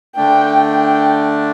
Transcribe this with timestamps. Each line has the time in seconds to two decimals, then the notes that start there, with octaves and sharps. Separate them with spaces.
0.16 D3 A3 D4 G5
0.68 G5